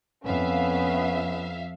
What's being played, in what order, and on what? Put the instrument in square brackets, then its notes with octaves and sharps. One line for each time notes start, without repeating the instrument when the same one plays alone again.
[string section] F2 E5 F5 [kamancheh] B3 C#4